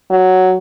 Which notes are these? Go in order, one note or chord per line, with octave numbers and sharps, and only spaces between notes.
F#3